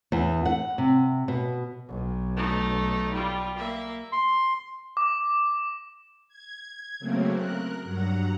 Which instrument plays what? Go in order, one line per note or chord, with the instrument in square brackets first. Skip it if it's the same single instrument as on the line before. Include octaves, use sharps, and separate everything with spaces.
[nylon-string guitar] E2
F#5
C3
B2
[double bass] B1
[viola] A3 D#4
G3 F4
A#3 E5
[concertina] C6
[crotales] D6
[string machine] G#6
C#3 F#3 A3 A#3 C4
A#4 F#6
G2 F#3 F#5 A#5